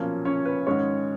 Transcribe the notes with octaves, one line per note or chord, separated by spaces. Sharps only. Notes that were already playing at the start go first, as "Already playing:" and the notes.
Already playing: B1 A#2 F3 A#3 C#4 F4
C#4 C#5
B4
G#2 D#3 G#3 C#4 C#5